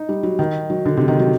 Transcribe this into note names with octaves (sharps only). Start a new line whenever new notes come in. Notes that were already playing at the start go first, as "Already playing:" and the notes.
Already playing: D#4
G3
F#3
D#3
F#3
D3
C3
D#3
F#3